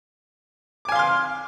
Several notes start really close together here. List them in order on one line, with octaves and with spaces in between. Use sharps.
D6 G#5 F5 C6 F6